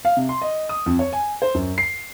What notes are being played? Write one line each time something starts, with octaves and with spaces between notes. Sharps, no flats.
F5
C3
C6
D#5
D#6
F2
C#5
G#5
C5
F#2
C7